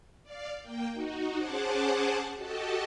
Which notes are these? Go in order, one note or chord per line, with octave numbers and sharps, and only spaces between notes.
D5 F5
A#3 G5
D#4 F#4
C#4 G#4 C5 F#5 A5 D6
F#4 G4 A4 D#5 A5